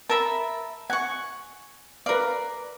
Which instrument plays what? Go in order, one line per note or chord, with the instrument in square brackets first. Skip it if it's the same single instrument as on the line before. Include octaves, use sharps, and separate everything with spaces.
[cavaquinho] A#4 E5 B5 [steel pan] A5
[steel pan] F#5 [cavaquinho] G#5 C#6
[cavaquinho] A#4 D5 [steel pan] B4 F5